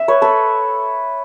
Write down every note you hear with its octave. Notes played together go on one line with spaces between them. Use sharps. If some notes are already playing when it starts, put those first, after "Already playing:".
Already playing: E5
B4 C#5
A4 B4